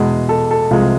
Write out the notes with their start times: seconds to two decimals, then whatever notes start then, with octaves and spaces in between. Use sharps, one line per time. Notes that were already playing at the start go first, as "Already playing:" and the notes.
Already playing: E2 B2 G#3
0.29 A4
0.51 A4
0.71 C2 C3 F3 G#3 F4